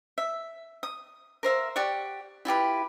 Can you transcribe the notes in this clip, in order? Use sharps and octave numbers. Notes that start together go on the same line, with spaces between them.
E5
D#6
A#4 C5 E5 F5
G4 D5 F#5 C#6
E4 F4 G4 B4